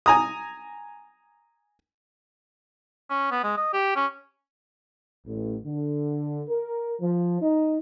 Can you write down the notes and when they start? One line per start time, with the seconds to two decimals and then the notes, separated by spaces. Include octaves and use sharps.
0.06 G#5 A#5 D#6
3.10 C#4
3.31 B3
3.44 G#3
3.57 D#5
3.73 G4
3.96 C#4
5.26 A1
5.65 D3
6.49 A#4
7.01 F3
7.41 D#4